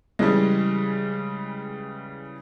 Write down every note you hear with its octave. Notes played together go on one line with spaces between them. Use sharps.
C#3 E3 G3 G#3